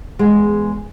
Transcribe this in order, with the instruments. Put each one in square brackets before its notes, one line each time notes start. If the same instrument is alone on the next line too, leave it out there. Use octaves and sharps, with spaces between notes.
[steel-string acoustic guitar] E2 G#3